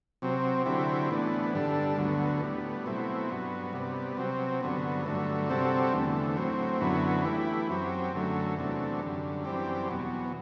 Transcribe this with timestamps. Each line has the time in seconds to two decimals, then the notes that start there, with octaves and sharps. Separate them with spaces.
0.22 C3 F#3 C4
0.66 D3 F#3 C4 E4 G4
1.10 A2 E3 B3 D4
1.53 G2 D3 G3 D4 A4
1.97 D2 D3 F#3 B3
2.41 A2 G3 B3
2.86 B2 F#3 A3 C4 E4
3.29 G2 F#3 B3
3.73 C3 G3 B3
4.17 C3 F#3 C4
4.61 G2 D3 F#3 B3
5.06 G2 D3 F#3 A3
5.50 C3 G3 C4 F#4 A4
5.93 E2 D3 A3
6.37 A2 F#3 C4
6.81 F#2 D3 F#3 B3 E4
7.25 E3 A3 E4 G4
7.69 F#2 F#3 C4 G4
8.13 F#2 D3 F#3 A3
8.56 E2 C3 F#3 A3 D4
9.01 F#2 D3 G3
9.45 F#2 E3 G3 C4 G4
9.89 E2 B2 F#3